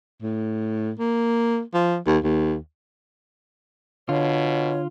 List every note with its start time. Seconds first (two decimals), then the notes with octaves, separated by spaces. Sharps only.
0.22 A2
0.99 A#3
1.74 F3
2.07 D#2
2.24 D#2
4.09 B2 D3 F4 C#5